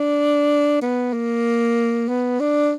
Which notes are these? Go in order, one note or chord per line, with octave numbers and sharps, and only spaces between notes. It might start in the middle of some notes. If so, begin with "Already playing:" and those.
Already playing: D4
B3
A#3
B3
D4